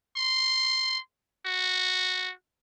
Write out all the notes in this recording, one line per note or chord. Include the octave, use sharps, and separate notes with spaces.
C6
F#4